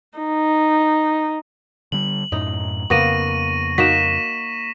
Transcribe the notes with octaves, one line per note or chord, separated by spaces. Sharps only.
D#4
D3 G3 F#7
F#2 A2 D#4
F2 C#3 A#3 B3 C#6 A#6 D#7
A#3 D#4 F#4 B6 E7